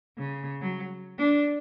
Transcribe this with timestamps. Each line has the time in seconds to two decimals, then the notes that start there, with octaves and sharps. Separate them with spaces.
0.17 C#3
0.61 F#3
1.19 D4